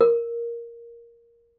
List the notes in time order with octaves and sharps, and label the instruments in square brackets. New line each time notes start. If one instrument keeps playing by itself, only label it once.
[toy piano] A#4